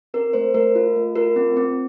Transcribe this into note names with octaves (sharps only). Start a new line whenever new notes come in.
C4 A#4
A3 C5
A3 A#4
F4
A3
F4 A#4
C4
C4